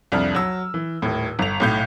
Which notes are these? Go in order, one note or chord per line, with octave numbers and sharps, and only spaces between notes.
C2 F2 D4 F6
F#3 E6
E3
D#1 A2
G1 F7
B1 A2 G6